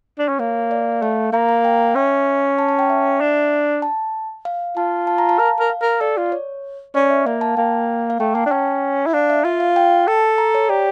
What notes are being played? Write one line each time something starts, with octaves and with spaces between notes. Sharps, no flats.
D4
C#4
A#3 C#5
D5
A3 F5
A#3 A#5
A#5
G5
C#4 E5
A5
A5
G5
E5
D4
A5
F5
F4 A5
A5
A#5
A5
A#4 F5
A#4
F5
A#4
A4 D5
F4
C#5
C#4 D5
E5
A#3 F5
A5
A#3 G5
F5
A3 G5
A#3 A5
D4
C#4 G5
E4
D4 F5
E5
F4 F5
F5
G5
A4 A5
A#5
C#5
G4 D5